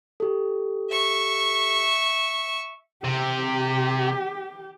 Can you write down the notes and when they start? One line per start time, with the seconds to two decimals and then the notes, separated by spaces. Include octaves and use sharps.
0.20 G4 A4
0.90 E5 C#6
3.04 C3 G4